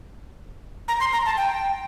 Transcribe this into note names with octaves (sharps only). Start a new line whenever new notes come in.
A#5
C6
A#5
A5
G5